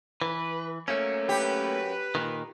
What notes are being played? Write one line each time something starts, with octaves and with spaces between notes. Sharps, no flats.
E3 B4
F#2 A3 A#3 C#4 C#5
G4 B4
A#2 D#3